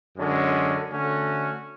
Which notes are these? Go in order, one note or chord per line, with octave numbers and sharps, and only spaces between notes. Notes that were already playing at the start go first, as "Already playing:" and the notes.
F#2 D3 G#3 C#4
D3 A3 C#4 F#4